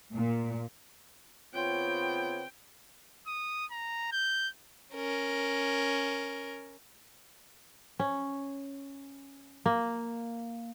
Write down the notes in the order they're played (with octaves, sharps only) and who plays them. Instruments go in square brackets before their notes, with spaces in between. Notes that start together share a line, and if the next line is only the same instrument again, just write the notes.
[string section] A#2
[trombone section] C#3 B3 C4 [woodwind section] F4 C#5 [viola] G5
[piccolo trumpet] D#6
A#5
G6
[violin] C#4 A#4
[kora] C#4
A#3